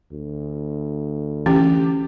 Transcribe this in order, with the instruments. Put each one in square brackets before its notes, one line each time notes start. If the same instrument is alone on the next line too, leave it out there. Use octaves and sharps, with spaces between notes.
[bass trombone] D2
[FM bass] E3 [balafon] C#4 [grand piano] G4